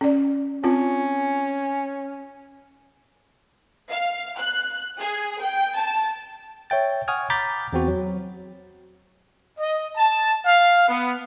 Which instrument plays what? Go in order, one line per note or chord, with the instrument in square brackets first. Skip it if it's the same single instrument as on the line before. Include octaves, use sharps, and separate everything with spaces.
[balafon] C#4 D5
[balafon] C4 F4 [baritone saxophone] C#4
[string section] F5
F#6
G#4
G5
A5
[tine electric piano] C#5 E5 G5 A6
F#5 G#5 C#6 D#6 F6 G#6
A#5 B5 D6 G6 A6 B6
E2 C4 F#4
F#3
[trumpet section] D#5
A5
F5
B3